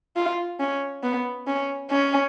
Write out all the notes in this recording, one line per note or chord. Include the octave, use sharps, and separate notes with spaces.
F4
C#4
B3
C#4
C#4